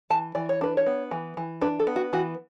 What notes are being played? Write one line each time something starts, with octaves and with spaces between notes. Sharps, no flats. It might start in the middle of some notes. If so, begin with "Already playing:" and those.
E3 A5
E3 D5
C#5
D4 B4
C#5
B3
E3
E3
D4 B4
A4
B3
F#4
E3 F#4